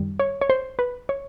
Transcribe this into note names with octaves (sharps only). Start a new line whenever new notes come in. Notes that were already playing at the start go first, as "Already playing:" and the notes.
Already playing: F#2 D#3 G3
C#5
C#5
C5
B4
C#5